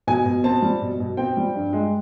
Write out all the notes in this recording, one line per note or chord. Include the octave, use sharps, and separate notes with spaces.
B2 G#5
B2
C4 A5
G3
B2
B2
C4 G5
G3
G2
G#3